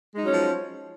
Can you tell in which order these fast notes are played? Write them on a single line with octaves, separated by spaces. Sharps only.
G#3 D#4 F#3 C#4 F3